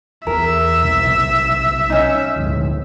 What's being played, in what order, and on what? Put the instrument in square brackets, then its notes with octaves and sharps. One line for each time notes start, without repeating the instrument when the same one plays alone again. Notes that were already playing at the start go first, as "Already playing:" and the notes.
[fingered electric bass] E2 [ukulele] A#4 [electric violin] E5
[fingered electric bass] B1 C3
[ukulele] C#4 D#4
[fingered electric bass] D2 G#2